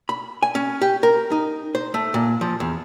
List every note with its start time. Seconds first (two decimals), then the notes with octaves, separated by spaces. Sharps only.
0.09 B5
0.42 G#5
0.55 C#4
0.82 G4
1.03 A#4
1.31 D#4
1.75 C5
1.94 A3
2.14 A#2
2.41 F3
2.60 E2